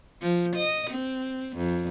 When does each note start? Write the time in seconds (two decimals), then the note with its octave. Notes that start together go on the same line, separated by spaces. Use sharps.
0.22 F3
0.56 D#5
0.91 C4
1.56 F2